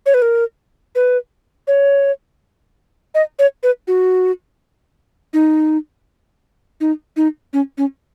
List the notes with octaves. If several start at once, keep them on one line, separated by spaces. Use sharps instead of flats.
C#5
B4
A#4
B4
C#5
D#5
C#5
B4
F#4
D#4
D#4
D#4
C#4
C#4